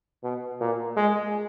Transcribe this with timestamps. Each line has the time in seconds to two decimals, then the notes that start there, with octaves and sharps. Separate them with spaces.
0.24 B2
0.60 A#2
0.97 G#3